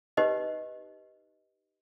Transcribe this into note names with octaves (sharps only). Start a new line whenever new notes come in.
D#4 G4 B4 C5 D#5